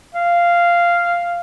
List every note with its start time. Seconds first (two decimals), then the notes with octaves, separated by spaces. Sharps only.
0.15 F5